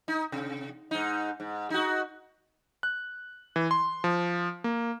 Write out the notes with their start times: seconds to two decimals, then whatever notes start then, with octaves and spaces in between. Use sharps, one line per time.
0.08 D#4
0.32 C3
0.91 G#2 D#4
1.40 G#2
1.70 D#4 F#4
2.83 F#6
3.56 E3
3.71 C6
4.04 F3
4.64 A#3